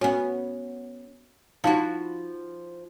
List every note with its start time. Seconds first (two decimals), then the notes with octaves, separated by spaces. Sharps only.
0.01 B3 C#4 F#4
1.64 F3 D#4 E4 F#4 F5 A5